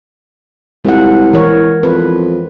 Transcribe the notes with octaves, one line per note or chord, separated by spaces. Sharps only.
C2 G#3 F4 F#5
E3 A#4 C#5
F2 B4